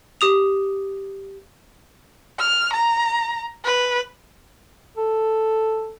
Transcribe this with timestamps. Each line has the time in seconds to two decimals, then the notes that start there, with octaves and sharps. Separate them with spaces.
0.21 G4 D#6 F7
2.39 F6
2.73 A#5
3.64 B4
4.97 A4